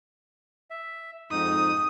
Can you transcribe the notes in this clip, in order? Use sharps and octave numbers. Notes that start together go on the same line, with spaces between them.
E5
F2 G#2 D#4 D#6